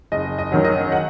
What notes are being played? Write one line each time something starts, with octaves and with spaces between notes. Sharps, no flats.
F#1 D#5
D#5
F#2 D#3 F#3
D#5
F#5